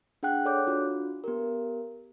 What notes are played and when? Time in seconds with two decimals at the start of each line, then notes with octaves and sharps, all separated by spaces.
0.23 D4 G#4 F#5 G5 F#6
0.45 A4 C#5 D5 D6 F#6 G6
0.67 D4 F4 F#4
1.24 B3 G4 A#4